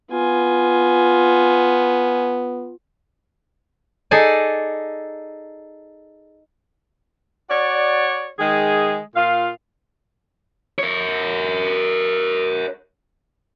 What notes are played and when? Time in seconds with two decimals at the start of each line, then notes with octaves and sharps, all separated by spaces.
0.11 B3 F4 G#5
4.11 D#4 G#4 A4 D5 G#5
7.49 F#4 C#5 D5
8.39 D#3 G#3 G#4
9.15 A#2 F4 F5
10.79 A#4 C#5